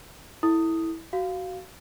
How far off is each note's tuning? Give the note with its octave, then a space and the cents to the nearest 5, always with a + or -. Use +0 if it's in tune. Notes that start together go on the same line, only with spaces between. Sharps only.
E4 -15 A4 +0 D#6 +0
F#4 +15 F5 +0